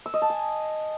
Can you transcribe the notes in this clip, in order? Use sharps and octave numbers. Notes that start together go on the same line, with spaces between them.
E6
D#5
A5
G#5